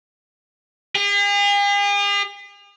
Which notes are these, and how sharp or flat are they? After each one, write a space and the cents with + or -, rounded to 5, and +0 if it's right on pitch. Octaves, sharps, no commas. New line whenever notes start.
G#4 -45